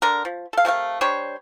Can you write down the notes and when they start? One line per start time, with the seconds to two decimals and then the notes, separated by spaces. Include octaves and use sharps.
0.02 D3 D4 A#4
0.25 F3
0.53 A4 F5
0.65 C3 A3 A#4 F5
1.01 G3 D4 C5 C#5